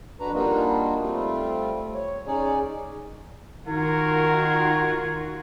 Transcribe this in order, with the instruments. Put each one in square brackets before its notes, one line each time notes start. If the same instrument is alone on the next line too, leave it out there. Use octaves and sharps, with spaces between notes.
[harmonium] F2 D4 F#4 B4 A#5
G3 A#3 D4 D#4 F4 F#4
G3 A3 C4 F4
C#5
C#4 D#4 G#4 C#5 D5
[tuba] D#3 [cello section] F4 F#4 [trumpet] A#4 [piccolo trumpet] G#6